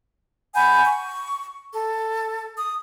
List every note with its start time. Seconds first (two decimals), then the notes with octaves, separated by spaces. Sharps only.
0.54 F#5 G#5 B5 G6
0.85 C#6
1.73 A4
2.58 D#6